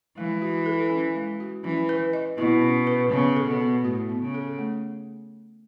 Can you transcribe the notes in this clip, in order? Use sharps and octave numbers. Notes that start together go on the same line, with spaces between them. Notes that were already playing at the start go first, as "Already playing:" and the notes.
E3 G#3
F#4
A4
C#4
G#3
F#4
E3 C#4
B4
D#5
B2 E4
C#4
B4
C#3 B3
A4
B2
B3
A2 F#4
B3
C#3
A4
A3